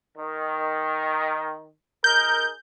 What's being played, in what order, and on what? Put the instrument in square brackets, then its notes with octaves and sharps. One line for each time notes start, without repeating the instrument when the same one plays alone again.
[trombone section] D#3
[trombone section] D#4 G#4 A#4 [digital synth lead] G6